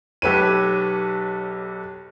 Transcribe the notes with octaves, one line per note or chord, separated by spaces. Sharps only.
B1 G4 A4 B4 C#5 D#7